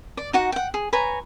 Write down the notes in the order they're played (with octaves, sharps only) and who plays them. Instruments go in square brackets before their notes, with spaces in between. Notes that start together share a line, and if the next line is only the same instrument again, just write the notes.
[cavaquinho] D5
D#4 F#4 F#5
F#5 G5
G#4
B4 C#5 G#5 A#5